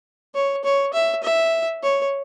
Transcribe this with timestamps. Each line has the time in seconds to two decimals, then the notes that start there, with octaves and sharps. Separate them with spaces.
0.35 C#5
0.64 C#5
0.93 E5
1.23 E5
1.83 C#5